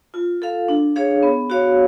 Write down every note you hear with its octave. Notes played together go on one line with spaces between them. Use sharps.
F4
A4 F5
D4
G#4 C#5 F5
B3
F#4 C#5 F5